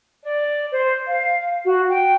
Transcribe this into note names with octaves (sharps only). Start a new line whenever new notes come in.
D5
C5
F5
F#4
G5